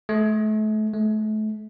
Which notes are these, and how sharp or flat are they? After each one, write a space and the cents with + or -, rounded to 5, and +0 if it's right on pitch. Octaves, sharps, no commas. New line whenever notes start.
A3 -35
A3 -35